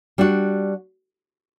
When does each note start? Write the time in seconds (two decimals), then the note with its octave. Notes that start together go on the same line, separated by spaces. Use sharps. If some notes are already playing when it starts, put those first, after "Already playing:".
0.18 G3 D4 F#4